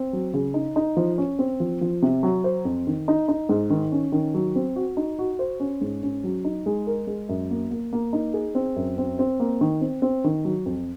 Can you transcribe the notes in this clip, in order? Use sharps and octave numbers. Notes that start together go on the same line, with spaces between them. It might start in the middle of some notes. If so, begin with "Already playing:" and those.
Already playing: C4
F#3
C#3
D#4
D#4
F3
C#4
C4
F3
F3
C3
F#3
C5
F2
D#3
D#4
D#4
G#2
D#3
C#4
D#3
F#3
C4
F#4
D#4
F#4
C5
C#4
G#2
C#4
F#3
D#4
G#3
A#4
G#3
F#2
A#3
A#3
A#3
D#4
G#4
C4
F#2
C4
C4
A#3
D#3
C4
C4
D#3
F#3
F2